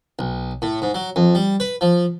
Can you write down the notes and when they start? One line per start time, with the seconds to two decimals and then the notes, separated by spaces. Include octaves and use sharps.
0.19 B1
0.62 A2
0.82 G#2
0.94 F#3
1.16 F2
1.35 G3
1.60 B4
1.81 F3